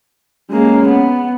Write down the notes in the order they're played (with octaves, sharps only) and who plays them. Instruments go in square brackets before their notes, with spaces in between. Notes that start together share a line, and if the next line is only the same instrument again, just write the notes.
[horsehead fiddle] G#3 A#3 [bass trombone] C#4
[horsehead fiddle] B3